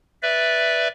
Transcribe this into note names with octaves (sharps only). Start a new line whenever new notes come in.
B4 D5 E5